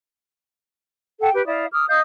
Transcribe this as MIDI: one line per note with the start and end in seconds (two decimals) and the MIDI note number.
1.21 1.30 69
1.21 1.30 78
1.21 1.30 79
1.34 1.44 67
1.34 1.44 71
1.46 1.65 64
1.46 1.65 74
1.46 1.65 77
1.46 1.65 87
1.72 1.85 86
1.72 1.85 87
1.72 1.85 89
1.88 2.00 75
1.88 2.00 77
1.88 2.00 87
1.88 2.00 91